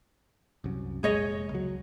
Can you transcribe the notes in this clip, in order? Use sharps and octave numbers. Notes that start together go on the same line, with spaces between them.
C2 F#2
F1 A#2 G#3 G#4 C#5 D#5
C#2 F#3